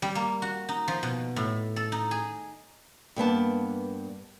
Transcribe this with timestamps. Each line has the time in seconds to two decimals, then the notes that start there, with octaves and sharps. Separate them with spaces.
0.02 G3
0.15 A#3
0.42 F#4
0.69 D#4
0.88 F3
1.03 B2
1.36 A2
1.76 A4
1.92 D#4
2.11 G#4
3.16 G2 A#3 B3 A5